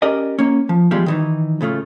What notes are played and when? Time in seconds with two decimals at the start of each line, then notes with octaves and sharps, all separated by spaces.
0.02 C#4 G4 A#4 D5 D#5
0.39 A#3 C#4
0.69 F3
0.91 E3 F3 G3 G#3 B3 F4
1.06 D#3 E3 D#4
1.61 A2 C#3 A3 F4